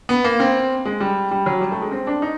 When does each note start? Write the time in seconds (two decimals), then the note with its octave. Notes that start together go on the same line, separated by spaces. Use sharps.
0.09 B3
0.24 A#3
0.40 C4
0.85 G#3
1.00 G3
1.31 G3
1.46 F#3
1.61 G3
1.72 A3
1.82 G#3
1.92 C4
2.07 D4
2.22 D#4